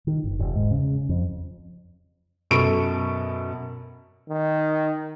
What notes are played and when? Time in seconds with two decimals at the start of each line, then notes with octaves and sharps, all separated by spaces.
0.07 D#3
0.24 G1
0.39 E1
0.56 G#2
0.71 C#3
1.09 F2
2.51 F#2 B2 A4 B5 C#6 D7
4.30 D#3